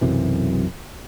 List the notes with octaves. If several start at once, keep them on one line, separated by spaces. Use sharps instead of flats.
B1 F#2 C3 E3